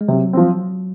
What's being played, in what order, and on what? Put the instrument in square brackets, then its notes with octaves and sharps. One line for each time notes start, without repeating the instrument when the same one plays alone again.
[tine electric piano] G#3
[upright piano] C3 [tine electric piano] F#3
[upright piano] F3 C4